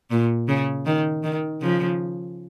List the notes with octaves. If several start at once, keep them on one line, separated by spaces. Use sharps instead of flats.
A#2
C#3
D#3
D#3
C#3 F3